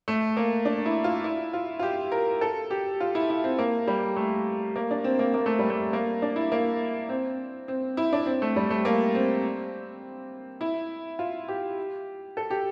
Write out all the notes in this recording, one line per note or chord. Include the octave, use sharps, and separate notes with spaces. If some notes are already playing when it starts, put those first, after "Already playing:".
A3
A#3
D4
E4
F4
E4
F4
F4
G4
A#4
A4
G4
F4
E4
E4
C4
A#3
G3
A3
A#3
D4
C4
A#3
A#3
A3
G3
A3
A#3
D4
E4
A#3
C4
C4
E4
D4
C4
A3
G3
A3
A#3
C4
E4
F4
G4
A4
G4